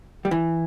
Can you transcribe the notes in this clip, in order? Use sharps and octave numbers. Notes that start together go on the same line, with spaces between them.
G3
E3